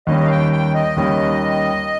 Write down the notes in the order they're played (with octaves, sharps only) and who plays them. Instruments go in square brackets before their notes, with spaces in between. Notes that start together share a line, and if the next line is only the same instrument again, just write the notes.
[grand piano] D#2 D#3 G3 C#4 [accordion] D#5
[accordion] F5
G5
G5
D#5
[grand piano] D#2 D#3 G3 C#4